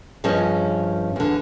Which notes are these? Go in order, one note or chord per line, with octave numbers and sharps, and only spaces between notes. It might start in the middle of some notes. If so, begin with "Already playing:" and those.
G2 F3 C#4 G#4 C5 D#5
E2 D3